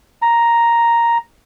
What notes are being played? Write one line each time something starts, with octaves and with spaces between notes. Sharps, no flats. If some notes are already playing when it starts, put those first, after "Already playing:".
A#5